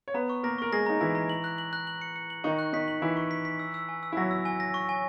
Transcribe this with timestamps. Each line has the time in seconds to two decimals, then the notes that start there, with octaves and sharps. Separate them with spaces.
0.08 C#5
0.14 B3 B4 A#5
0.30 C#6
0.43 A#3 A#4 A#6
0.58 A#4 C#6
0.72 G#3 G#4 A#6
0.86 D#4 A#5
1.00 E3 E4 A#6
1.15 A#5
1.29 F#7
1.44 F#6
1.58 F#7
1.73 F#6
1.87 F#7
2.02 C#7
2.16 C#7
2.30 F#7
2.44 D#3 D#4 C#6
2.59 F#6
2.73 D#3 D#4 B6
2.88 F#7
3.02 E3 E4 F#6
3.17 C#6
3.31 B6
3.45 B6
3.59 E6
3.74 E6
3.89 G#5
4.03 E6
4.12 E4
4.17 F#3 F#4 A#6
4.31 E6
4.45 G#5
4.60 A#6
4.74 C#6
4.89 G#5